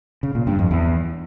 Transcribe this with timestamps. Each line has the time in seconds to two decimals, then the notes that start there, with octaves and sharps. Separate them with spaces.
0.23 C#3
0.35 A#2
0.47 G2
0.59 F2
0.71 E2